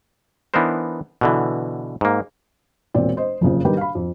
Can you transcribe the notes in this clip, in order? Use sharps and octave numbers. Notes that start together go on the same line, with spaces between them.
E3 B3 D4 D#4 A#4 C5
B2 D3 E3
G#2 A#3
E1 A#2 C4 D5
C5 D#5
F#1 F2 C#3 F3
D#3 G3 G4 A#4 B4
F5 B5
F2